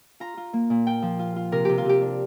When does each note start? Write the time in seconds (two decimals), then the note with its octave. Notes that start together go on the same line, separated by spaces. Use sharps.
0.20 F4 A#5
0.37 F4
0.53 A#3
0.70 A#2
0.87 F4 G5
1.02 F3
1.19 F4
1.36 F4
1.52 C3 A#4
1.65 C3 G4
1.78 F4
1.85 C3 G4
2.01 D4